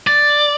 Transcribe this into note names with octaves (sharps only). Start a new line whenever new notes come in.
D5